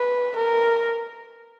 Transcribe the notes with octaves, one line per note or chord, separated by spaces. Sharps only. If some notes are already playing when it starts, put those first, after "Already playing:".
Already playing: B4
A#4